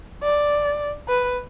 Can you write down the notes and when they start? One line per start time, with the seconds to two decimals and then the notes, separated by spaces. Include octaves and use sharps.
0.23 D5
1.09 B4